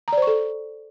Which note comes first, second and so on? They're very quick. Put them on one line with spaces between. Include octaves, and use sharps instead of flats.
A#5 D5 C5 C#6 A4